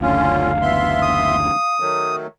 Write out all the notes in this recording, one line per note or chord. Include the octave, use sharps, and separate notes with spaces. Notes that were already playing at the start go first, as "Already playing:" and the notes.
F#1 D2 D3 C#4 F4 F5
B3 E5 C6
D#6
D#3 F#3 A3